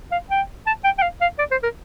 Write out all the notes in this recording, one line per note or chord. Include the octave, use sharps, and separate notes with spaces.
F5
G5
A5
G5
G5
F5
F5
D5
C5
A#4